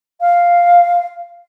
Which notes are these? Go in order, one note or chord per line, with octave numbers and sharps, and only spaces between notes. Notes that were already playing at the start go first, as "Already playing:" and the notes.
F5